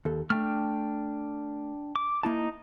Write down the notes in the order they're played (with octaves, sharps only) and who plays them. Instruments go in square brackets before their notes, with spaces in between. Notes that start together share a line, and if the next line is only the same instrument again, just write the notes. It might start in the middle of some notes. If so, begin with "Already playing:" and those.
[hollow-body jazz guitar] D#2 A4
[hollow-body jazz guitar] A3 [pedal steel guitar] D4 G5 F6
[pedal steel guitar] D6
[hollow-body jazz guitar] A#3 E4 A5 [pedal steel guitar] D#4